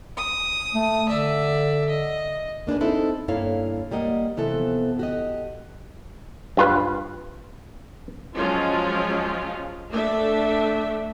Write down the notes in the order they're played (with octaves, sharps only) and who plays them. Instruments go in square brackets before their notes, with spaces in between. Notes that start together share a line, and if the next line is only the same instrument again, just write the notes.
[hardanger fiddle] D#6
[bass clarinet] A3
[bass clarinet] D3 [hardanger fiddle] D5 E5
[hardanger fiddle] D#5
[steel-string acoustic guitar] A#3 D4 G#4 B4
C4 D#4 E4 A4
G2 A#3 E4 A4 C#5 F5
G3 A#3 D#5 F#5
C3 E3 F3 B3 A4 E5
F#4 G4 D#5
[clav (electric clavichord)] G2 F4 B4
[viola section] F3 F#3 G#3 C#4 F4
A3 D4 A4 E5